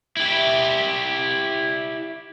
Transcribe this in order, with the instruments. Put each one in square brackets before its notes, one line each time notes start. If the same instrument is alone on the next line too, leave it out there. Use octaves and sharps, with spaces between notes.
[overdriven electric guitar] E4 G4